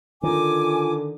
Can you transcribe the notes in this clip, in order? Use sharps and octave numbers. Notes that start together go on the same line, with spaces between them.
D3 D#3 F4 G#5 D6